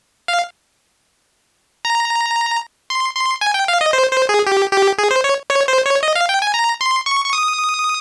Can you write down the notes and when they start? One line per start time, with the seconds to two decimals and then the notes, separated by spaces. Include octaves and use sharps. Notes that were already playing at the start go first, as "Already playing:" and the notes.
0.28 F5
1.85 A#5
2.90 C6
3.15 C6
3.41 G#5
3.54 G5
3.68 F5
3.81 D#5
3.93 C5
4.12 C5
4.29 G#4
4.47 G4
4.72 G4
4.98 G#4
5.11 C5
5.24 C#5
5.50 C#5
5.68 C5
5.85 C#5
6.03 D#5
6.16 F5
6.29 G5
6.42 G#5
6.54 A#5
6.81 C6
7.06 C#6
7.25 C#6
7.33 D#6